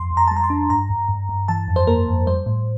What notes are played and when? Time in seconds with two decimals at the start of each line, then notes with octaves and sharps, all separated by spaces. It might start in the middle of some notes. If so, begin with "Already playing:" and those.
Already playing: F2 C6
0.11 F2
0.17 A#5
0.27 A5
0.31 G3
0.37 A#5
0.44 C6
0.50 D4
0.70 G2 A#5
0.90 G2
1.09 G2
1.29 G2
1.48 E3 A5
1.68 F2
1.76 C5
1.87 A#3 A#4
2.08 F2
2.27 G3 C5
2.46 A2